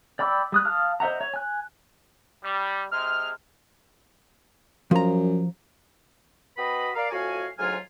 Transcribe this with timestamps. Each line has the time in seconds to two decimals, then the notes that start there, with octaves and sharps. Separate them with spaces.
0.19 D5 G5 B5 D6 E6
0.52 G3 D#6 F#6
0.65 F5 A5 D#6 F6
1.00 C5 D#5 E5 F#5 A#5
1.21 C#5
1.34 G#5 F#6
2.43 G3
2.91 C3 G#3 F6
4.91 F#2 F3 A#5
6.57 C4 F#4 B4 D#5 B5
6.95 A#4 D5 F5
7.11 F2 A2 F#4 F5 G#5
7.58 D2 G#2 F#3 F4 G#5 F6